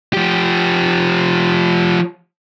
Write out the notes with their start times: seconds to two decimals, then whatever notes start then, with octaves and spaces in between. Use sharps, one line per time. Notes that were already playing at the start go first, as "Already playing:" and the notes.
0.13 F3 G4